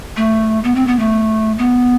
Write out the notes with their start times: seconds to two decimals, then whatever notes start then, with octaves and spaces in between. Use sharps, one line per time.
0.17 A3
0.64 B3
0.75 C4
0.87 B3
0.99 A3
1.58 B3